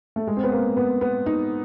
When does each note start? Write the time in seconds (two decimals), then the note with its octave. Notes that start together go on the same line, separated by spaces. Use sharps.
0.16 A3
0.27 G#3
0.37 C4
0.44 B3
0.52 A#3
0.77 B3
1.01 B3
1.26 D#4